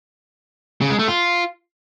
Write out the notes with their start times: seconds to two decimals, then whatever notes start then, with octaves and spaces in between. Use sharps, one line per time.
0.81 C#3
0.90 G#3
0.99 A3
1.08 F4